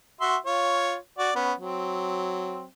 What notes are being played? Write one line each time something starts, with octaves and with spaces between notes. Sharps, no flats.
F#4 E5 C6
F4 C#5
F#4 D5
B3 C#4
F#3 C4